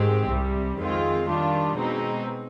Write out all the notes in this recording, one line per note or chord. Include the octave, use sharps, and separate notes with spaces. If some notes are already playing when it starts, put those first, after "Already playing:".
Already playing: G#2 D#3 G#3 C4 G4
C2 C3 G3
F2 D#3 G#3 C4 F4
D#3 G3 D4 F4
B2 G#3 C4 D#4